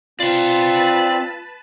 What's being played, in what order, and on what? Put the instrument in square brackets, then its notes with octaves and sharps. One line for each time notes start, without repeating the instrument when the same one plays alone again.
[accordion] C4 [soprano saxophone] F4 [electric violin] B4 A5 [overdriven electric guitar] D5 C6